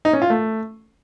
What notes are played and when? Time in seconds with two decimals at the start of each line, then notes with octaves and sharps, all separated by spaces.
0.05 D#4
0.13 C#4
0.22 F4
0.30 A3